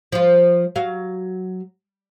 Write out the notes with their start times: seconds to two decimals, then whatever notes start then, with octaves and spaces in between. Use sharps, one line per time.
0.12 F3 F4
0.76 F#3 F5